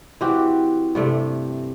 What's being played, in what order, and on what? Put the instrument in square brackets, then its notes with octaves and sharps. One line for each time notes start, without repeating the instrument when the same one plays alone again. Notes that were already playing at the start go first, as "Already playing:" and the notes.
[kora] E3 C4 F#4 G4
G2 C3 A3